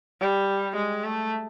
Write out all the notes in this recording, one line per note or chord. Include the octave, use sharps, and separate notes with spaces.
G3
G#3
A3